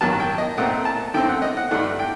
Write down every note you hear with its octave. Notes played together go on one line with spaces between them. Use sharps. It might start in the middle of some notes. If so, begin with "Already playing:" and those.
A1 G2 D#3 F#3 A#3 A5
G5
D#5
A#2 A3 C4 F#5
A5
F#2 D3 A3 C4 G5
F#5
D#5
F#5
G2 D3 A3 D4 F#5
G5